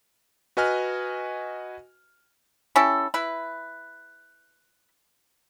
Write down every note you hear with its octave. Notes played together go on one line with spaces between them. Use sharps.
F#4 B4 D#5 G#5 F6
C#4 E4 G4 A4
E4 B4